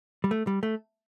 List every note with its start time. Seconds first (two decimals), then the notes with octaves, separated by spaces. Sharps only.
0.24 G3
0.31 A3
0.47 G3
0.63 A3